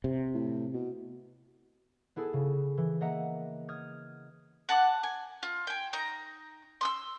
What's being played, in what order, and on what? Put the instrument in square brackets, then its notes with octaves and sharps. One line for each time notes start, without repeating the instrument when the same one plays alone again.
[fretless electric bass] C3
[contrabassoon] A2
B2
[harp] B3 E4 G#4 A4
C#3
E3
A#3 D#5 E5 F#5 A#5
D#6 F6 G#6
[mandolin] F#5 A5 A#5 D6
G#5
F4
G5 G#5
D#4 A#5
C6 D#6 E6